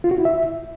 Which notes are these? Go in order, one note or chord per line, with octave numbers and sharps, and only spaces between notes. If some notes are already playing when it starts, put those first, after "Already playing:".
F4
F#4
E4
E5